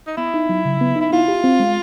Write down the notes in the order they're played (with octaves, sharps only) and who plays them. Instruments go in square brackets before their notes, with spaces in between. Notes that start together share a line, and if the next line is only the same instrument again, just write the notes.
[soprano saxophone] D#4
[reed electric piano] B3 [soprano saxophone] E4
[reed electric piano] D#4
F#3
C#3
B3
D#4
[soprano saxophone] E4
[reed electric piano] E4 [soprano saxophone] F4
[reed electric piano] G4
C4
G#3